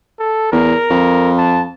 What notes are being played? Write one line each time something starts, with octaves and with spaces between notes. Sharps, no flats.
A4
E2 A#4
F2
A5